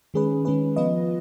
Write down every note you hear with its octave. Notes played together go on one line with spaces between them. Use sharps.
D#3 G#3 C#4 G#4 B4
D#3 G#3 C#4 G#4 B4
F3 B3 F4 B4 D#5